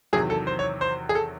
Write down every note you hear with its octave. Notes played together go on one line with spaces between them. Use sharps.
E2 C3 D#3 F#3 G#4
A4
C5
C#5
C5
G#4
A4